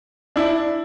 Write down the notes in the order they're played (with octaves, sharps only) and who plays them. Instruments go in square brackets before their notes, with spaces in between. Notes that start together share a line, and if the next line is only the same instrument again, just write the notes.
[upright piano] D4 E4